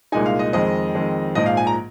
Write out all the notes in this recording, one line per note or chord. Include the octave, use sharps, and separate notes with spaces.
C2 A#2 G#3 D#4 G#5
F5
D#5
F2 D#3 G#3 C4 D#5
F2 D#3 G#3 C4
A#1 G#2 F3 D#5
F5
G#5
A#5